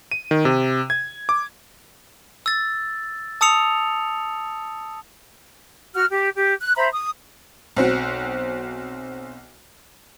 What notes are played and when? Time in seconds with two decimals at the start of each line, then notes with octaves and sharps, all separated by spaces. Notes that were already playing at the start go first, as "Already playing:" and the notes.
0.11 D#7
0.31 D#3
0.45 C3
0.90 G#6
1.29 D6
2.46 E6 A6
3.41 A5 D#6 E6 C#7 F7
5.94 F#4 F6
6.10 G4
6.36 G4
6.60 F#6
6.76 C5 E5 A#5 B5
6.91 D#6
7.76 B1 C4 F#4